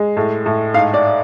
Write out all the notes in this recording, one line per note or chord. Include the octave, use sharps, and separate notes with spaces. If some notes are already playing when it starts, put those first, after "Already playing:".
Already playing: G#3
A2
A2
G#2 F5
D5